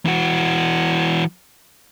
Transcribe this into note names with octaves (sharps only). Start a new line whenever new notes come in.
E3 F#4